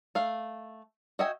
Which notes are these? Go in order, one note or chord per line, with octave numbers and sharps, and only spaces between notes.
A3 F5
F#4 D#5 E5 G5 G#5